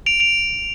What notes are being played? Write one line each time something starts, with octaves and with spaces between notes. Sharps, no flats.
D7 F7
D7 F7